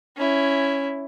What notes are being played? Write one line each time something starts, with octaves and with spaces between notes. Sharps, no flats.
C#4 E4